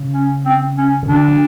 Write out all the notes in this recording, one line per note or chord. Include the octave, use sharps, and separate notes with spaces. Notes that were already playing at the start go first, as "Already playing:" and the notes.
Already playing: C#3
C#4
C4
C#4
C#3
D3 D4
F3